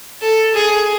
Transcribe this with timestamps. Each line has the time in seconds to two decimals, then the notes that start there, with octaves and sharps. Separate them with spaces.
0.22 A4
0.54 G#4